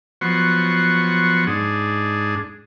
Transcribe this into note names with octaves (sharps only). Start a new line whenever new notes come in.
F3 F#3 B3 F#5 C6 C#6
G#2 D4 G#4